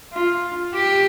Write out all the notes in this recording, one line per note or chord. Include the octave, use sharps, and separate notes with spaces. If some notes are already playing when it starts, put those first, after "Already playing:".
F4
G4